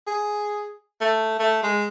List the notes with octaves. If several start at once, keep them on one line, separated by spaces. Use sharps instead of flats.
G#4
A3
A3
G#3